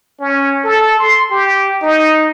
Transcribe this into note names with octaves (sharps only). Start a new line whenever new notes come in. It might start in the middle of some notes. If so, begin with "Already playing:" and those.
C#4
A4
C6
G4
D#4